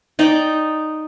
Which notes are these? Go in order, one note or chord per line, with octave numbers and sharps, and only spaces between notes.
D#4 D5 G5 D6